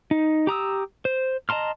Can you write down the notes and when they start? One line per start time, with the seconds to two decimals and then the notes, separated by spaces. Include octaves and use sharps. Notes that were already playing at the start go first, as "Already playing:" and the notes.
0.11 D#4
0.47 G4 A#5 D#6 E6
1.05 C5
1.49 D#5 A5 A#5 C6 F6